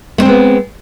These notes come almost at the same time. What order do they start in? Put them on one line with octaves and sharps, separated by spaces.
A3 C4 G#3 B3